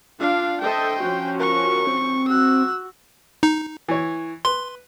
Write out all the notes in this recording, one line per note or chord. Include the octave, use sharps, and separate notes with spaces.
D4 F4 F5
A4 C5 D#5 E5 G5
F3 C#4 F#4
A#4 C#6
C4
F#4 E6 F#6
D#4
E3 C#5
B4 C6